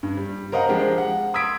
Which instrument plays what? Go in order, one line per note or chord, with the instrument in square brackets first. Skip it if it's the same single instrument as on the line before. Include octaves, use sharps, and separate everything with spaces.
[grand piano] G2
G3
A#4 C5 D#5 F5 F#5 A#5
F3 G#3 D4 G4 A#4 C5
F#5
C6 D#6 E6 G#6 B6 D7